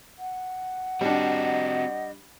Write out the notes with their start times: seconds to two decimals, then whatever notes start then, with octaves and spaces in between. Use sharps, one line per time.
0.19 F#5
1.01 G3 C4 D4 F#4 D#5